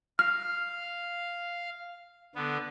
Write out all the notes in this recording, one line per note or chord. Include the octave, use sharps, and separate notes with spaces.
F5 F6
D3 B3